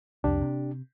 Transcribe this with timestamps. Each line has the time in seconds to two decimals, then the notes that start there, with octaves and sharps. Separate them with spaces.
0.24 C2 F2 D4 G4
0.42 C3